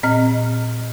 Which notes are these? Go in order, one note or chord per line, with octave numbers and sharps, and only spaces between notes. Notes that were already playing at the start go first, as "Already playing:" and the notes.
A#2 C4 D#5 F6